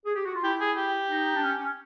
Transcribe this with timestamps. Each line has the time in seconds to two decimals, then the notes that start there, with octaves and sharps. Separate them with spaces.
0.06 G#4
0.15 G4
0.25 F#4
0.34 F4
0.43 E4 G4
0.60 G#4
0.77 G4
1.09 D#4
1.36 D4
1.42 C#4
1.58 C#4